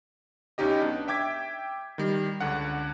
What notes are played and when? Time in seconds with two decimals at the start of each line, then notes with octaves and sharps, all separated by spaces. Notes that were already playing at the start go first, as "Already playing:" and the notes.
0.58 B1 C#4 D#4 G4 D#5
0.81 B3 D4
1.08 E5 G5 D6 G#6 B6
1.98 D#3 G3
2.40 C#2 D3 F#5